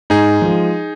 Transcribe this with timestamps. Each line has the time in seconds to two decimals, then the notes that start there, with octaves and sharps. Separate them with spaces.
0.10 G#2 D#4 G#4
0.42 F3 G#3